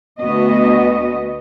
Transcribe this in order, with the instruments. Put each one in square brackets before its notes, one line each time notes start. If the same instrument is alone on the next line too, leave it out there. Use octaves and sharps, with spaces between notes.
[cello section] D2 B3 F#4 D#5